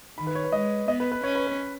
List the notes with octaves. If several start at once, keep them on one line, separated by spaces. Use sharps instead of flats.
D#3 B5
B4
C#5
B4
G#3 D#5
B3 D#5
B4
B4
C#4 C#5
B4
B4